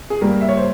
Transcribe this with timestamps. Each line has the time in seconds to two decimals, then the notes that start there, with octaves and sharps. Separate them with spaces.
0.10 G#4
0.21 G2 G3 A#3 G4 A#4
0.41 E5
0.49 C#5
0.57 C5